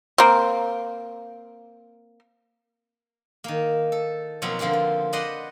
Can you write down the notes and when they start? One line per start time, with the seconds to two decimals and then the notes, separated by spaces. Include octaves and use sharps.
0.18 A#3 C4
3.44 D#3 A#3
3.92 A4
4.42 B2 F3 F#3 A#3 C4
4.59 D3 F3 A#3 C4 F4
4.73 F4
5.13 B4 C5 D5 D#5 F#5 C6